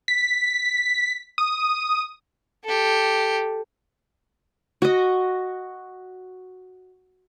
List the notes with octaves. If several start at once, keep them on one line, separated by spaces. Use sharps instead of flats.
B6
D#6
G4 A4
F#4 D#5